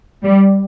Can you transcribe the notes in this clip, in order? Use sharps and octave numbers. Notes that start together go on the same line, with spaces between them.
G3